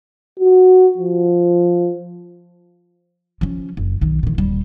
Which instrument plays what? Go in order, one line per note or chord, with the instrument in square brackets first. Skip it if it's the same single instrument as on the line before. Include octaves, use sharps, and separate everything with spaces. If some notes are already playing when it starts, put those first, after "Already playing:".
[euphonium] F#4
F3
[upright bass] F3 C#4
F#1
B1 D#3
A#2 D#3
D#1 G3